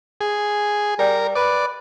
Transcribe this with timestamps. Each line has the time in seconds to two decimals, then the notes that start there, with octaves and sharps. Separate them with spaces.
0.21 G#4
0.99 G3 A#4
1.35 B4 D5